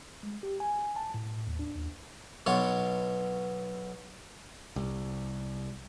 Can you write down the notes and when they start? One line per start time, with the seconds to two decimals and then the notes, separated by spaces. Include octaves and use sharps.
0.23 G#3
0.43 G4
0.60 G#5
0.96 A5
1.14 A2
1.47 D#2
1.59 D4
1.76 D#2
2.46 B1 B2 F4 C#5
4.76 C2